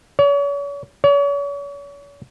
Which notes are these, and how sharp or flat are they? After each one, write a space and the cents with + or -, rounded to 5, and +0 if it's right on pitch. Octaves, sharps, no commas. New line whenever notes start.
C#5 +40
C#5 +40